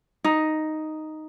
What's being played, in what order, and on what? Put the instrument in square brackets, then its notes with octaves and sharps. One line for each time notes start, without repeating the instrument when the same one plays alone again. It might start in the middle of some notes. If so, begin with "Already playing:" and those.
[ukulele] D#4